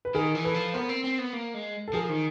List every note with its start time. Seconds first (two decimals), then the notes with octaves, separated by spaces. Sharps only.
0.05 B4
0.15 D#3 G#4 A#4
0.35 E3
0.45 A4 B4
0.54 F3
0.74 B3 A#4 C5
0.89 C4
1.04 C4
1.19 B3
1.34 A#3
1.55 G#3
1.88 A4
1.93 F3 G#4 A#4
2.09 D#3